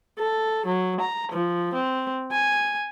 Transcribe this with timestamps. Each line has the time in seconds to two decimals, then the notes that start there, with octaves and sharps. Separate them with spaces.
0.19 A4
0.66 F#3
1.00 A#5
1.32 F3
1.74 C4
2.32 G#5